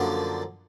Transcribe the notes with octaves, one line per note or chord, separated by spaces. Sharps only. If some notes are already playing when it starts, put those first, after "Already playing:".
Already playing: F#2 D3 F3 A#3